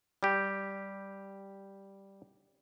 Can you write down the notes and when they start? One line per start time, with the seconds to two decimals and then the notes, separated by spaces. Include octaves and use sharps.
0.23 G3 G4